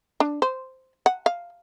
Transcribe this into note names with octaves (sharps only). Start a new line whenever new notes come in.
D4
C5
F#5
F5